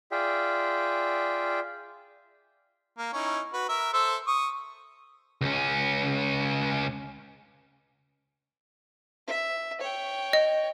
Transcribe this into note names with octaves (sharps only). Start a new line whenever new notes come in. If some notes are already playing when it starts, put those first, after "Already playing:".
F4 G#4 D5 E5 G5
A#3
C#4 D#4 E4
F#4 B4
A#4 E5
A4 C5 E5
C#6 D#6
C#2 C#4
E5
C#5 G5
D#5